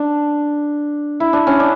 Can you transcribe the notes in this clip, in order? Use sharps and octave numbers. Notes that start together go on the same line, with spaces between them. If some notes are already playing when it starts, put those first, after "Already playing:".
Already playing: D4
E4
D4
C#4
D4